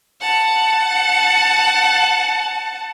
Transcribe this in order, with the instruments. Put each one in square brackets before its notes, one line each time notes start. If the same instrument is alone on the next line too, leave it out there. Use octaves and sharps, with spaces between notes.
[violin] F#5 A5